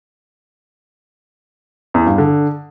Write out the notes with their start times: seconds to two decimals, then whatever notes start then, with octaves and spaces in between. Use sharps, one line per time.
1.94 E2
2.06 G2
2.18 D3